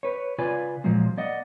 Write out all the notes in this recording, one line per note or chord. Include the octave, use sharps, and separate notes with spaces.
B4 C#5
C#3 F4 B4 D5 G#5
A#2 F3 F#3 G#3 A#3
A#3 D5 D#5 F#5